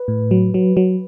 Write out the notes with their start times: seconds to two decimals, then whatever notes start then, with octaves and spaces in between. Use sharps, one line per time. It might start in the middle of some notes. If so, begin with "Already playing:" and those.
Already playing: B4
0.08 A2
0.31 F#3
0.54 F#3
0.77 F#3